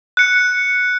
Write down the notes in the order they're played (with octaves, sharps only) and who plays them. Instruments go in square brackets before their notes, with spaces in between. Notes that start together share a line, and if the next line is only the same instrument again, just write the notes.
[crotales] F#6 C#7